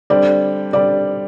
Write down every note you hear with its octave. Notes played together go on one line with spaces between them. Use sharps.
D3 G3 C4 D5
D3 G3 C4 D5